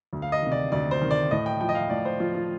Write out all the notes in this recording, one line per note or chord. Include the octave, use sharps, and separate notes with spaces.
D2
F5
D#5
C3 D#3
D5
D2 D5
C5
C3 D#3
D5
A2 D#5
G5
F3 G5
D#5
F5
A2 D5
C5
F3 F4
F4